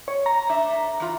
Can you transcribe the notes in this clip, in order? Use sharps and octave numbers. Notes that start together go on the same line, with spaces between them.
C#5
A#5
A3 D4 E5
E3 F4